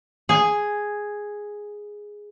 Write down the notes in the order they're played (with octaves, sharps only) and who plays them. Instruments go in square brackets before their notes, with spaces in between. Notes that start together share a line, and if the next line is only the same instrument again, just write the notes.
[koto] G#4 G#5